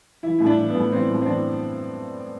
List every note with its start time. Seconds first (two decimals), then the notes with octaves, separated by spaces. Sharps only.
0.23 E3 E4
0.38 A2 E4
0.46 D4
0.58 E3
0.69 B3
0.75 A2
0.92 E3 C4
1.10 A2
1.22 C4
1.26 E3 D4